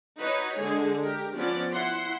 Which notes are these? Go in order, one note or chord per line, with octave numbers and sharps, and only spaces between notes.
D#4 F#4 B4 C#5
D3 G#3 G#4
G4 A#4
F3 B3 C#4 D5
E4 F#5 C6